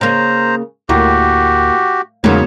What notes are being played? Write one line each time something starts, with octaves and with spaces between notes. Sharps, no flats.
C#3 A#3 C5 A#5
D2 A2 A#3 F#4 G4
E2 G#2 C#3 F#3 A#3 B3 C#5